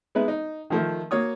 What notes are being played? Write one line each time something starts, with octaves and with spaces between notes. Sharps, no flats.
G#3 B3 D#4 B4 E5
D#4
D#3 F3 A3
A#3 F#4 C#5 D#6